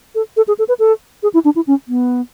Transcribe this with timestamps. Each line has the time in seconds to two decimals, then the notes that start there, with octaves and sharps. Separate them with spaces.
0.15 A4
0.37 A4
0.48 G#4
0.59 A4
0.68 B4
0.79 A4
1.23 G#4
1.34 E4
1.45 D4
1.56 E4
1.67 C#4
1.88 B3